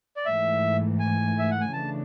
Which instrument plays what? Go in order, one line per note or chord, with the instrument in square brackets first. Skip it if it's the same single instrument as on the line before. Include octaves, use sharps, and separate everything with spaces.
[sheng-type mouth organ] D5
[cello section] G#2 E3 A3 [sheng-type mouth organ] E5
[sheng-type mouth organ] G#5
E5
F#5
G#5
[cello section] C#3 E3 A3 D4 [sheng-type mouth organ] A5